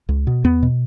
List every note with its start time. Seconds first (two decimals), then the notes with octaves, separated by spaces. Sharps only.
0.09 C#2
0.27 B2
0.44 E2 B3
0.63 B2